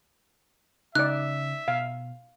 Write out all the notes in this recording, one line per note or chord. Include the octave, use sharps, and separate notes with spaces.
C#3 D#4 D5 E5 F#6
B2 F5